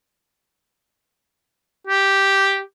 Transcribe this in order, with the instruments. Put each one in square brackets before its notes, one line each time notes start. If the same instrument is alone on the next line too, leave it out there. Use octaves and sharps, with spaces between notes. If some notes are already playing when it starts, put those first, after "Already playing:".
[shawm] G4